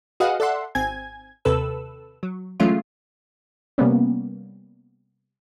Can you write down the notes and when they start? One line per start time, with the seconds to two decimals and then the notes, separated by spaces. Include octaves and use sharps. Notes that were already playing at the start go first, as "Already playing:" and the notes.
0.20 F#4 G#4 B4 D#5 F5 F#5
0.40 A4 D5 E5 F#5 C6
0.75 G#1 C4 G#5 G#6
1.45 D#2 C3 A4 B4 E6
2.23 F#3
2.60 E3 F#3 G#3 A3 C#4 F4
3.78 C3 G3 A#3 B3 C#4